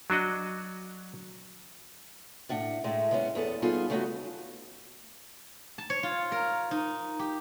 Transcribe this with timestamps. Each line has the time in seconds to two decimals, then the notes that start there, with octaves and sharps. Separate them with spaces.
0.10 F#3 D4 F#4 D#5
2.49 A2 D4 F#5
2.84 A2 G#3 A3
3.11 G#3 B3 C#4
3.35 E2 B3 G#4 A4
3.62 G3 B3 D#4 F4 G#4 A4
3.90 C#3 G3 A3 B3 D#4 F#4
5.78 A5
5.90 C#5
6.03 F4
6.32 A#4
6.71 D#4
7.19 G4